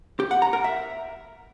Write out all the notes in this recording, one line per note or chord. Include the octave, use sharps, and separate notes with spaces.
G4
F#5
A#5
A#4
E5